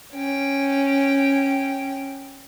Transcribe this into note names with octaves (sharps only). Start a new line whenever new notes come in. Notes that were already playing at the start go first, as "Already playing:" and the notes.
C#4 G5